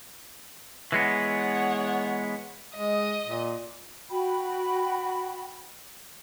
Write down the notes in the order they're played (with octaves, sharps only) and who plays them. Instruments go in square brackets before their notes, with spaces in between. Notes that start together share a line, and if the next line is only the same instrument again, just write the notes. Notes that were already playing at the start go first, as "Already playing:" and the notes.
[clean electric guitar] E3 G#3 B3 [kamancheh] C#5 F#5
[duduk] G#3 [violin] D#5
[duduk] A#2
[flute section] F#4 G5 B5